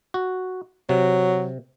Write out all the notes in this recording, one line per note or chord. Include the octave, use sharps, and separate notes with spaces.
F#4
C3 F#3